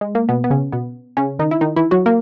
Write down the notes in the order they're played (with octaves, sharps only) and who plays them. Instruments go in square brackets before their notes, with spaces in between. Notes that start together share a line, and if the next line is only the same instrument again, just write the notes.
[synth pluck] G#3
A#3
B2 B3
B3
C#3 C#4
B2 B3
C#3 C#4
D#3 D#4
E4
D#3 D#4
E3 E4
F#3 F#4
A#3 A#4